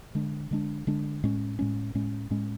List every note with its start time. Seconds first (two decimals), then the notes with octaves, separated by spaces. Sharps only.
0.15 D3 G#3 D4
0.51 D3 G#3 D4
0.87 D3 G#3 D4
1.24 A2 G#3 C#4
1.59 A2 G#3 C#4
1.95 A2 G#3 C#4
2.31 A2 G#3 C#4